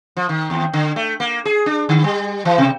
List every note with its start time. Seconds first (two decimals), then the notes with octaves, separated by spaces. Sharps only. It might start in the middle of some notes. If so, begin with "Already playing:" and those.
0.17 F3
0.29 D#3
0.50 D#2
0.73 D3
0.96 A3
1.20 A#3
1.45 G#4
1.66 D4
1.89 D3
2.04 G3
2.45 E3
2.58 B2